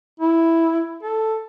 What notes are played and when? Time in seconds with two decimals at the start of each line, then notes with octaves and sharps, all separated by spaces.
0.20 E4
1.03 A4